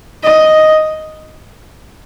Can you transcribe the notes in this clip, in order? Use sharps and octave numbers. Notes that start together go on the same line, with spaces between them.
D#5